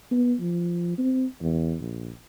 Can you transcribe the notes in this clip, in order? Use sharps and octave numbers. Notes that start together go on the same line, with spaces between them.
B3
F3
C4
E2
A#1